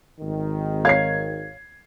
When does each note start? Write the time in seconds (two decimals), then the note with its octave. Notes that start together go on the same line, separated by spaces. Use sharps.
0.21 G#1 D#3
0.85 C#5 F5 G#6 C7